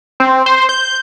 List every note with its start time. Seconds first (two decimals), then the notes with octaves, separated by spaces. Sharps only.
0.20 C4
0.46 C5
0.69 G6